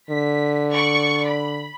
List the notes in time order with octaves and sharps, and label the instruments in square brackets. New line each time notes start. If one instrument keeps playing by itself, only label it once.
[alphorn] D3 [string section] B6
[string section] D5 C#6
B5